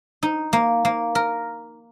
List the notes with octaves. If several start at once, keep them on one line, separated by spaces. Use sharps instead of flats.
D#4
A#3
A#3
A#4